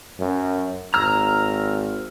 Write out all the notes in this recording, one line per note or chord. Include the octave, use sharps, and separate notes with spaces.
F#2
G#1 A#5 E6 F6